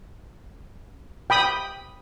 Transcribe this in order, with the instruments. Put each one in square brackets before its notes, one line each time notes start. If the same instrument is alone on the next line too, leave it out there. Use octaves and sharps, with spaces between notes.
[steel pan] G5 B5 D#6